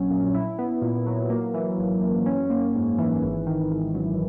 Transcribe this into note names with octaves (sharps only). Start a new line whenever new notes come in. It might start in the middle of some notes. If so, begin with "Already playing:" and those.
Already playing: A#1 F#3 C#4
A#2
E4
B3
A#2
F#3
A#3
E3
G#1
F#2
C#4
A#3
G#2
E3
G#1
D#3
G#1
F#2